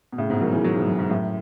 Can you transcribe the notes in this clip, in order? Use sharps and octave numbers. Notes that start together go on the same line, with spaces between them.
B2
A2 C#3
G#2 B2
D#3 F#3
C#3 E3
D#3 F#3
G#2 B2
F#2
G#2
F#2 A2